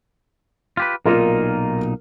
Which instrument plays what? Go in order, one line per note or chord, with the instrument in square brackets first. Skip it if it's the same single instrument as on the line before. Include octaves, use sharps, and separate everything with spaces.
[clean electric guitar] F4 G4 B4
[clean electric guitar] B1 A#2 D#4 [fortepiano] A#3 F4 A#4